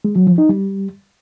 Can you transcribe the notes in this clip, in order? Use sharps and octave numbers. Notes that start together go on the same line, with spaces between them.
G#3
F#3
F3
D#4
G3